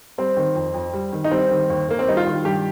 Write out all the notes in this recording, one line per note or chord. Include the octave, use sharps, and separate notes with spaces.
G3 C4
D#3
F2
F2
G3
D#3
D#4
G3 C4
D#3
D#2
D#2 A#3
C4
G3 D#4
F4
D#3
G2 G4